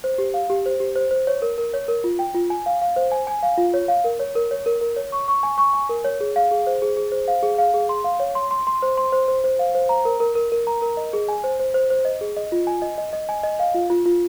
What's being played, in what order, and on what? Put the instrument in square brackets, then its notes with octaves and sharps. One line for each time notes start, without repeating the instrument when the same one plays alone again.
[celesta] C5
G4
F5
G4
C5
G4
C5
C5
C#5
A#4
A#4
C#5
A#4
F4
G5
F4
G#5
F5
F5
C5
G#5
G#5
F5
F4
C#5
F5
A#4
C#5
A#4
C#5
A#4
A#4
C#5
C#6
C#6
G#5
C#6
G#5
A#4
C#5
G#4
F5
G#4
C5
G#4
G#4
C5
F5
G#4
F5
G#4
C6
F5
C#5
C6
C6
C6
C5
C6
C5
C5
C5
F5
C5
A#5
A#4
A#4
A#4
A#4
A#5
A#4
D#5
G#4
G#5
C5
C5
C5
C5
D#5
G#4
D#5
F4
G#5
D#5
D#5
D#5
G#5
D#5
F5
F4
F4
F4